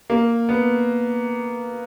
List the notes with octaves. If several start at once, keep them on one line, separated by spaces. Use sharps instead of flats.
A#3
B3